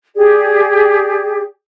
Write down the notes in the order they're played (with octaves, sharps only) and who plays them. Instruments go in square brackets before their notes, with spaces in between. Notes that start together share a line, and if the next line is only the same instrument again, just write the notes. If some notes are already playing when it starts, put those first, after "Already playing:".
[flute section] G4 G#4 D5